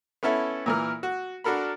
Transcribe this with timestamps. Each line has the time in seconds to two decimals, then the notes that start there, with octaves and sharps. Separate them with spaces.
0.23 B3 C#4 E4 A4 E5
0.66 A#2 E3 A#4
1.03 F#4
1.44 D4 F#4 A4 A#4 B5